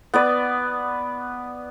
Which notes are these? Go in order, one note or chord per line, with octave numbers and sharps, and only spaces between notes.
B3 B4 D5